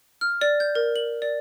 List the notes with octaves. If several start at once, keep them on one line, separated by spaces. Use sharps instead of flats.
F6
D5
G6
A#4
F#7
D5